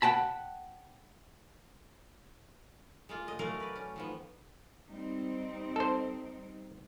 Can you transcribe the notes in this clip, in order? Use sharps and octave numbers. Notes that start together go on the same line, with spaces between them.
F#5 G5 A5 B5
G#3 A#3 F4
A2 D#5
F#3 A3 C#4 F#4 A#4 F5
B4 D5
C#4
D#3 F3 B3
G3 C4 D#4
A4 C5